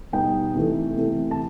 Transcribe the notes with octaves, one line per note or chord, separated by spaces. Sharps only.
B2 G3 B3 D#4 G5
C3 E3 A3
C3 E3 A3
A5